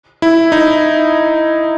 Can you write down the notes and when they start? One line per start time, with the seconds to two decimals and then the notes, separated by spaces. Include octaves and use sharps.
0.22 E4
0.52 D#4